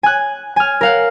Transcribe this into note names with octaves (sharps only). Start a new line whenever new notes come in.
G#5 F#6
G#5 F6
A#4 F5 F#5